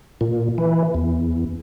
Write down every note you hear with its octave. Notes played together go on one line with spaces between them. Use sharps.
A#2
E3
E2